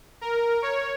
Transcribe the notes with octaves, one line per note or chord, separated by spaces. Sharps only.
A#4
C#5